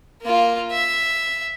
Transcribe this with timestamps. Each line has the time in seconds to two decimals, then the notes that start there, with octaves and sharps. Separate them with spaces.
0.22 A#3 F4
0.71 E5